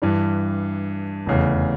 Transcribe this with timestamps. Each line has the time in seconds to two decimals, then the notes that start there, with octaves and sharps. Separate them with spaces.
0.02 G2 E3 G3 D4
1.26 F1 E2 C#3